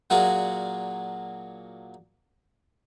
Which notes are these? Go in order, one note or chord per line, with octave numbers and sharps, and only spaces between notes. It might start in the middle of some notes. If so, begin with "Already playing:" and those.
A#2 F#3 A#3 D4 F#4 G#4